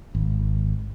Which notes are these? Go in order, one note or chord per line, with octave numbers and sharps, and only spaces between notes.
G#1